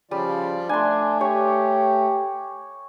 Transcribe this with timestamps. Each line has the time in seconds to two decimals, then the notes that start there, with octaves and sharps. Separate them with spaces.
0.11 C#3 F3 G3 F4 D5
0.69 A3 D4 G#5 C6
1.21 G4 C#5